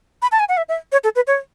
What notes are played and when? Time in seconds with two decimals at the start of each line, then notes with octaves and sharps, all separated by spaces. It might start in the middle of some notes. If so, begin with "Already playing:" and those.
0.22 B5
0.32 A5
0.39 G#5
0.49 F#5
0.57 E5
0.69 E5
0.92 C#5
1.04 A4
1.15 B4
1.27 C#5